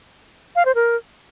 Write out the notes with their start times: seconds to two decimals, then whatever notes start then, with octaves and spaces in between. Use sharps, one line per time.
0.56 F5
0.65 C5
0.75 A#4